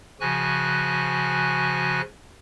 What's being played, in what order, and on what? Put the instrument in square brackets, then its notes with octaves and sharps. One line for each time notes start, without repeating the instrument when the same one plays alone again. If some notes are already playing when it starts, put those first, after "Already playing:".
[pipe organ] C#3 F3 F#4 G#5 F#6